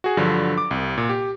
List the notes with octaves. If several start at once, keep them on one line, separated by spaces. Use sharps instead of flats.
F#4 G#4
G2 D3 F3 F#3
D6
C2
A#2
G4